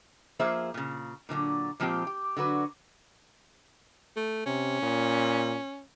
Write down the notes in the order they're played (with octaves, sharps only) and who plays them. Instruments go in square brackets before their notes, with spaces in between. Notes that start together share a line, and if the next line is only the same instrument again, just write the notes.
[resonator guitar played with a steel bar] F3 A#3 G#4 C5 E5
A#2 C#3
A#2 D3 E3 F#3
A#2 F3 G#3 C4 G4
G4
D3 F#3 F#4 B4
[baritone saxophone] A3
[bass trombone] C3 [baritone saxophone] C#4
[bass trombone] A#2